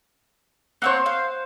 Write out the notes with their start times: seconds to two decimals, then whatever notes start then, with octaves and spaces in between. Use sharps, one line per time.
0.82 A#3 C4 C5 C#5 F#5
1.06 F5